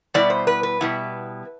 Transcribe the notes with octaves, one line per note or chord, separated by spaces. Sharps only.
B2 G3 B3 E4 D5
C5
B4
B4
B2 G3 B3 E4